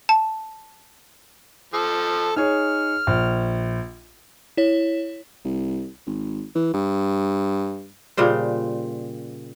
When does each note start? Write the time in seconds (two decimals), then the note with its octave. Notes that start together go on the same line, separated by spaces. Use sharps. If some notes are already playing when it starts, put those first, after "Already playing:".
0.09 A5
1.74 F3 A4
2.36 D#4 G#4 C#5 F6
3.07 A#1
4.57 E4 C#5
5.45 C2
6.07 G#1
6.56 E3
6.74 G2
8.17 A#2 C#3 G3 C5